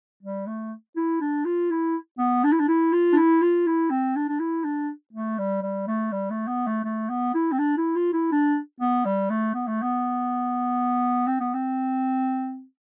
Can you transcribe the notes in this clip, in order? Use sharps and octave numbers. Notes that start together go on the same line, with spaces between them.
G3
A3
E4
D4
F4
E4
B3
D4
E4
D4
E4
F4
D4
E4
F4
E4
C4
D4
D4
E4
D4
A3
G3
G3
A3
G3
A3
B3
A3
A3
B3
E4
C4
D4
E4
F4
E4
D4
B3
G3
A3
B3
A3
B3
C4
B3
C4